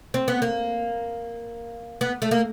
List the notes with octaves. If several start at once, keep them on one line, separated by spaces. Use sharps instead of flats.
C4
B3
A#3
B3
A3
A#3